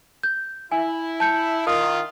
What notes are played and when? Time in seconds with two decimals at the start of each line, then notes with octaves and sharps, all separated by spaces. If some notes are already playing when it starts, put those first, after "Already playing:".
0.23 G6
0.72 E4 G#5
1.20 A5 G6 C#7
1.67 D#3 F4 D#6 F6